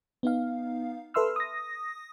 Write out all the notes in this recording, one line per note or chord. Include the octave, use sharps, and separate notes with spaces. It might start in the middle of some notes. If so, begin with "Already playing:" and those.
B3 D#4 F5
A4 B4 E5 C6 E6 F6
D#6 A#6